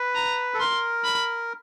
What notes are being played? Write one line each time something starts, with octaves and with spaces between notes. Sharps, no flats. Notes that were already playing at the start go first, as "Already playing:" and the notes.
Already playing: B4
A#5
A4
A#4 C6
B5